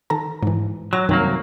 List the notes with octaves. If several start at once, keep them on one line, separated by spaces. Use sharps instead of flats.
D#3 A4 A#5
G#2 E3
F#3 A#6
C2 F#2 D#3 F#3 A#3